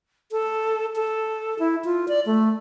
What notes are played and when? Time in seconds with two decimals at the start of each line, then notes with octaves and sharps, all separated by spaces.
0.32 A4
0.96 A4
1.59 E4
1.85 F4
2.08 D5
2.26 A3